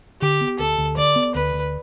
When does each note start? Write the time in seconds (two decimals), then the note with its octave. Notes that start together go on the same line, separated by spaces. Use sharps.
0.22 D3 G4
0.41 B3
0.59 D2 A4
0.78 D2
0.97 D3 D5
1.16 B3
1.35 D2 B4
1.54 D2